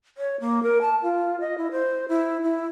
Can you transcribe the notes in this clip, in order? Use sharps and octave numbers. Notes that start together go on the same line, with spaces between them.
C#5
A#3
A#4
A5
F4
D#5
E4
C5
E4
E4